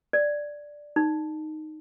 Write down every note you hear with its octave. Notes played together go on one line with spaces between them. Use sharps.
D5
D#4